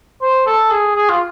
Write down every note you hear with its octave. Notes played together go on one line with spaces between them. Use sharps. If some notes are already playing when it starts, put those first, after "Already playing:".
C5
A4
G#4
G#4
F4